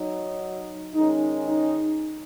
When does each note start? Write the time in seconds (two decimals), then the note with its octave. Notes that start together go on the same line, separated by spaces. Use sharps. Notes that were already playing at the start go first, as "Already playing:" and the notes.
Already playing: F#3 D#4
0.95 D#3 G#3 C#4 D#4
1.48 D#4